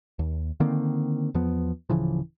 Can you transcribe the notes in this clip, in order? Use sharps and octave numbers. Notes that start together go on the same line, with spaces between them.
D#2
D3 D#3 A#3 C4
E2 F3 B3
D1 C#3 E3 F3